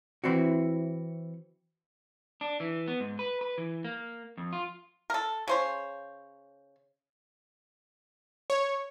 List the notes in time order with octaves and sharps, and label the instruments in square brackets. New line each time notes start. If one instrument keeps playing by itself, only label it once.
[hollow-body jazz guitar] E3 C4 E4 F#4
[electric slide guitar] D4
E3
B3
G#2
B4
B4
E3
A#3
F2
F4
[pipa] A4 A#4
C#3 C5 C#5
[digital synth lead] C#5